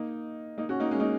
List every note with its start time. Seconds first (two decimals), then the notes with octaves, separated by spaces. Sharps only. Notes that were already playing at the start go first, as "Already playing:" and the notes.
Already playing: A#3 D#4
0.58 A#3 D#4
0.69 C#4 F#4
0.80 A#3 D#4
0.91 G#3 C#4
1.00 A#3 D#4